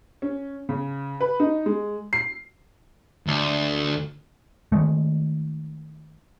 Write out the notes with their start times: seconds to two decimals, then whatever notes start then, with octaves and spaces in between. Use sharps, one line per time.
0.22 C#4
0.69 C#3
1.21 B4
1.40 D#4
1.66 G#3
2.13 C7
3.27 D2
4.72 D#3 G#3 A3